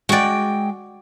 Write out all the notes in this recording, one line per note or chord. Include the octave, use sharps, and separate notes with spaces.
G#3 F#4 D5 G5